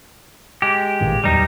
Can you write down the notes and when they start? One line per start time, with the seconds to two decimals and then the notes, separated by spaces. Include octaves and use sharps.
0.62 G#3 G4
1.01 A1 A#2 D#3
1.24 D1 E2 F#3 G3 D#4